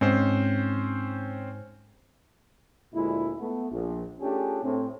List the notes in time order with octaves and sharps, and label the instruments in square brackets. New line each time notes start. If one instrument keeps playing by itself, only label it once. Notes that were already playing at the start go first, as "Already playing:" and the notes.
[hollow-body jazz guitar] G#2 [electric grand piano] C4 C#4 C5
[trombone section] D2 A#2 G#3 E4
A3 B3
A#1
A3 C#4 D4 F4 G4 G#4
A2 C4